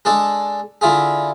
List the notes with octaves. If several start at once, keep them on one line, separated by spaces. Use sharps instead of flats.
G#3 D4 G#4 A4
D3 E4 F4 G#4